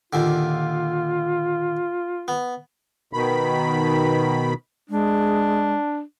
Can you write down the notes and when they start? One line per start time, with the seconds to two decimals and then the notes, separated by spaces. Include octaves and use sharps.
0.13 D#2 A#2 D3 F4
2.28 B3
3.13 B2 D#3 B5
4.90 G#3 D4